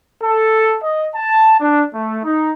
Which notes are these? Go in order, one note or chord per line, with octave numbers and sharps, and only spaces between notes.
A4
D#5
A5
D4
A3
D#4